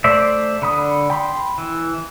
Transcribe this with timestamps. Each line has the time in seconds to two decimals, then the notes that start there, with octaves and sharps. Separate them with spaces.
0.04 A3 C5 D5 E5
0.62 D3 B5 D#6
1.10 G5 B5 C6
1.58 E3